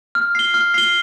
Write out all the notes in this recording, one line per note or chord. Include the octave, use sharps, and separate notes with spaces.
F6
C7 G7
F6
C7 G7